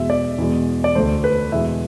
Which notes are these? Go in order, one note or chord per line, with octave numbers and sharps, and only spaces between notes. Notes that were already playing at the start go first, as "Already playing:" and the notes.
Already playing: E2 B2 G#3 E5
D5
E2 B2 G#3
D5
D2 D3 A3 C5
B4
E2 B2 G#3 E5